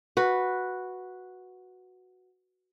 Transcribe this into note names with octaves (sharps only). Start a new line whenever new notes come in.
F#4 B4